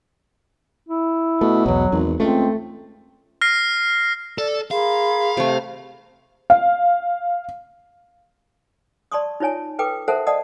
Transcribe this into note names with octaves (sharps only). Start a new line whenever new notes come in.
E4
B2 A3
B1 E2 F#3
G#1 E2
C#2 A3 C4
F6 A#6 C7
A4 D5 E6
G#4 A#4 F5 B5 C6
C3 A3
F5
D5 A5 C6 C#6 D#6
D#4 F4 C#5 G#5 A5
A4 B4 G5 D6
A4 A#4 C5 E5 F#5 A5
D5 D#5 F#5 A5 D#6